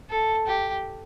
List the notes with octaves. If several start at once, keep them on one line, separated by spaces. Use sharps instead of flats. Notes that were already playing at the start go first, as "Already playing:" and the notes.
A4
G4